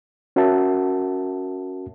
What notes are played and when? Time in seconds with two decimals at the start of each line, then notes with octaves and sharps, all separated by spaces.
0.36 C#4 F#4 A#4 C#5 E5 A5